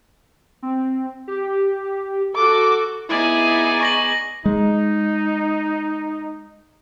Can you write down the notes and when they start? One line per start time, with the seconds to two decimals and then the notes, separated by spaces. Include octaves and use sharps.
0.63 C4
1.28 G4
2.35 F#4 A4 D6
3.09 B3 D#4 E4 G#4 D5 G#5
3.81 C#6 A#6 F#7
4.46 G#3 D#4